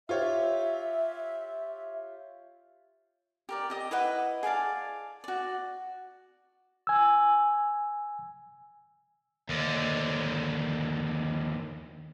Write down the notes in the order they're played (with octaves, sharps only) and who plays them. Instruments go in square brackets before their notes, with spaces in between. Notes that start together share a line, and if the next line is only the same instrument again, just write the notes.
[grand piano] F4 G4 C#5 [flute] E5
[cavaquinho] G4 A#4 D5
G4 D#5 D#6
E4 B4 D#5 F#5
G#4 D5 F5 A5
F#4 D5
[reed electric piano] G#5 E6
[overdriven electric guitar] D#2 D3